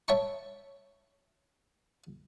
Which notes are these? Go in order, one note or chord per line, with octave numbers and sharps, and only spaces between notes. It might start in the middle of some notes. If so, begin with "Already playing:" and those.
C#5 E5 G5 A5 B5 C#6